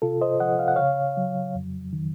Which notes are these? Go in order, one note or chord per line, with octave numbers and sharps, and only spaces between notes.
C3 F4 A4
C5 D#5
F3 D#5 F#5
F5
F#5
C#3 C#5 F5
F#3
F2
D#3